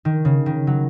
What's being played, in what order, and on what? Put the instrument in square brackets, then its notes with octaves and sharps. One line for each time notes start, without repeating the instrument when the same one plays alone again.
[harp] D#3
C#3
D#3
F#3